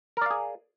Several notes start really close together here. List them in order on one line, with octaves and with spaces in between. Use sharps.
A#4 D5 F5 G#4